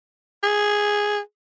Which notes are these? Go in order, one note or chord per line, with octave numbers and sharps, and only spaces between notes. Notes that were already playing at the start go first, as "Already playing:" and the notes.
G#4